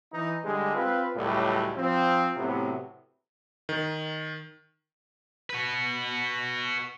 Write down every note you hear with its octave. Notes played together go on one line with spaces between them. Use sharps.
E3 D#4
D3 G3 G#3
C4 F4 B4
C#2 A2 F#3 G3
F3 C4
A2 C3 F#3 B3
D#3
F#4 B4